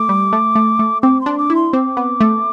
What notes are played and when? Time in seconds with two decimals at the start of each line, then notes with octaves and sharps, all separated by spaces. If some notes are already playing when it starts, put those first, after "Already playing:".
Already playing: A3 D6
0.09 G3
0.33 A3
0.55 A3
0.79 A3
1.02 C4 D6
1.21 C6
1.26 D4
1.38 D6
1.50 E4
1.55 C6
1.73 C4 D6
1.97 B3
2.21 A3